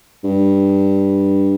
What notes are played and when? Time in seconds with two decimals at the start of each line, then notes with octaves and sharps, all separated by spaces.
0.24 G2